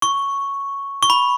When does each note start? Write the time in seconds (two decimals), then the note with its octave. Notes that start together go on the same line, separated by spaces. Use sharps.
0.02 C#6
1.03 C#6
1.10 B5